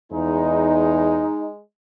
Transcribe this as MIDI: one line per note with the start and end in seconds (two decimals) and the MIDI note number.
0.13 1.28 40
0.13 1.61 56
0.13 1.48 63